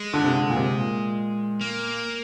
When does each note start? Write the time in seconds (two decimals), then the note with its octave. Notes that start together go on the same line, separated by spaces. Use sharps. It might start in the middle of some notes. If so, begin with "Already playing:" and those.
Already playing: G#3
0.14 D3
0.24 C3
0.35 D3
0.49 A#2
0.56 C3
0.77 A#2
1.61 A#3